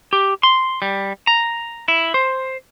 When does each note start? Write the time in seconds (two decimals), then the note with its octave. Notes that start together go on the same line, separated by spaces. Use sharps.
0.13 G4
0.43 C6
0.82 G3
1.27 A#5
1.88 E4
2.14 C5